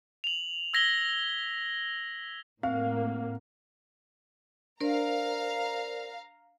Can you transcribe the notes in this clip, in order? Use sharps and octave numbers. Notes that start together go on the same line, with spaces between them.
F7 F#7
E6 G#6 A#6 B6 F#7 G7
A2 A#3 C4 F5
D4 A#4 C5 D5 F5 A#5